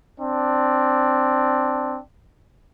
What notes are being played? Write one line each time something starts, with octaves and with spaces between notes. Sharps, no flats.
C4 D4